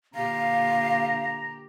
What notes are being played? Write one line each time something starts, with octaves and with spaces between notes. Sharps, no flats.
A#2 D3 G4 F5 A#5